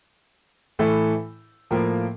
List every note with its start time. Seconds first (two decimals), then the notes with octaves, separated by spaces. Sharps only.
0.79 A2 E3 A3 E4 A4
1.71 A2 F3 A#3 F4 A#4